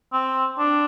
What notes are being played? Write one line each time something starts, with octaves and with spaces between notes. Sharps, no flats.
C4
D4